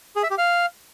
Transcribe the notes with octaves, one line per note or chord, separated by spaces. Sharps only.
G#4
E5
G4
F5